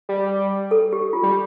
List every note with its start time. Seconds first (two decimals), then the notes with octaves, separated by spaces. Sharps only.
0.09 G3
0.71 A4
0.93 G4
1.13 F4
1.23 G3